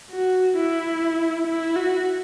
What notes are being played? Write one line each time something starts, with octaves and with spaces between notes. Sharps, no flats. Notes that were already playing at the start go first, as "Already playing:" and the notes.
F#4
E4
E4
F#4